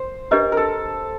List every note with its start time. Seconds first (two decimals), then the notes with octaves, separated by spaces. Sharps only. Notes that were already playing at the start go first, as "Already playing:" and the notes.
Already playing: C5
0.31 D4 G4 A#4 B4 D#5
0.52 A4 A#4